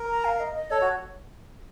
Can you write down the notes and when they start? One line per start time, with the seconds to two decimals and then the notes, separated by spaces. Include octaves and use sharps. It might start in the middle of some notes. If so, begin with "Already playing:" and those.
Already playing: A#4
0.09 A#5
0.25 F5
0.40 D#5
0.55 D#5
0.71 A4 C#5
0.81 F#4